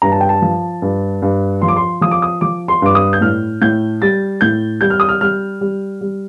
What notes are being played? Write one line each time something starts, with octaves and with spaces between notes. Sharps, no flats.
G2 A#5
A5
G5
A5
F3
G2
G2
F3 C6
D6
C6
F3 D#6
D6
D#6
F3 D6
C6
G2 D6
D#6
G6
A2 F6
A2 G6
G3 A6
A2 G6
G3 G6
F6
D#6
F6
G3 F6
G3
G3